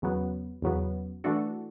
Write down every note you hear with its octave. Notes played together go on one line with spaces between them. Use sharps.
E2 C#3 F#3 B3
E2 C#3 F#3 B3
E3 A3 D4 F#4 A4